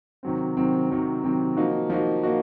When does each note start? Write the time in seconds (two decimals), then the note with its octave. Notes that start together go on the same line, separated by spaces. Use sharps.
0.23 C3 D#3 F#3 C4
0.57 C3 D#3 F#3 C4
0.90 C3 D#3 F#3 C4
1.24 C3 D#3 F#3 C4
1.57 F3 A#3 D#4 F#4
1.90 F3 A#3 D#4 F#4
2.23 A#3 D#4 F#4